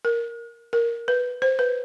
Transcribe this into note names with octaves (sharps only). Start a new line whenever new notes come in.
A#4
A#4
B4
C5
B4